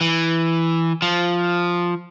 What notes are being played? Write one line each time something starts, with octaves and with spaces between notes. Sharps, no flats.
E3
F3